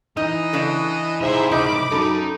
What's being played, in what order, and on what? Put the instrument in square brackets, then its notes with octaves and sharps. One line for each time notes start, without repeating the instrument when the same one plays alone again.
[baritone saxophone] E3 [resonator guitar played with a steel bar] D#4 [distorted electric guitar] D#5
[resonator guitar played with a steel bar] C#3 D4 A4
[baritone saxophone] G#2 [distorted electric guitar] C3 A#5 [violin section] E4 C5 E5
[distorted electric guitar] C3 A#3 [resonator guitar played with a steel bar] D#4 [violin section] B5 D6
[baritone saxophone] F#2 [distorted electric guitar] D#4 A#5 [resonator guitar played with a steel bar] A4